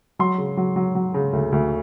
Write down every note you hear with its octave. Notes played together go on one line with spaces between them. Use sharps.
F#3 C6
C#3
F#3
F#3
F#3
C#3
D2
D2